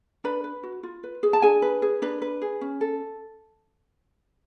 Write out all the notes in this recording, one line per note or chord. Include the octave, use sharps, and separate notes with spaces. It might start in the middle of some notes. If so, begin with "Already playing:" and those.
D4 B4 B5
B4
F#4
F4
B4
G#4
A5
D4 G#4 G#5
B4
G#4
D4 B4
B4
G#4
C#4
A4